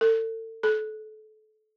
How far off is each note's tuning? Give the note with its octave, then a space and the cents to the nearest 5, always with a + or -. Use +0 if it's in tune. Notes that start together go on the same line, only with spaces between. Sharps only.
A4 +35
A4 -30